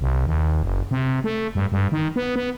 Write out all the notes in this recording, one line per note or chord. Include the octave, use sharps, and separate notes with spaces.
C2
D#2
F#1
C3
A3
G2
G2
D#3
B3
B3